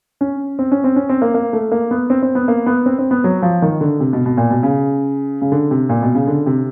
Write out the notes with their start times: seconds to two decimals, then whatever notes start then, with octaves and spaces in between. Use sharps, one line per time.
0.21 C#4
0.59 C4
0.71 C#4
0.84 C4
0.96 C#4
1.09 C4
1.22 A#3
1.34 A#3
1.53 A3
1.71 A#3
1.91 B3
2.10 C4
2.23 C4
2.35 B3
2.48 A#3
2.66 B3
2.86 C4
2.99 C4
3.11 B3
3.24 F#3
3.42 F3
3.62 D#3
3.81 D3
4.00 C3
4.13 B2
4.26 B2
4.37 A#2
4.50 B2
4.63 C#3
5.42 C#3
5.52 D3
5.71 C3
5.89 A#2
6.02 B2
6.15 C#3
6.27 D3
6.46 C3